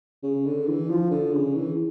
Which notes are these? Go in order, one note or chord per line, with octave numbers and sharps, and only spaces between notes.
C#3
D3
E3
F3
D3
C#3
E3